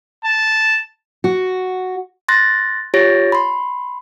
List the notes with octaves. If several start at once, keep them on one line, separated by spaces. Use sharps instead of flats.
A5
F#4
C6 F#6 A6 A#6
F4 G4 C#5 A6 A#6 D7
B5 C6